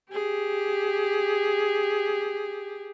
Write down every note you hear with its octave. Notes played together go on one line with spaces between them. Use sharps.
G4 G#4